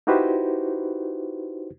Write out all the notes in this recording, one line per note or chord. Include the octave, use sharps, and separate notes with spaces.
D#4 E4 F#4 G4 B4 C5